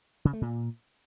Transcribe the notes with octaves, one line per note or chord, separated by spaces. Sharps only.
C#3
A3
A#2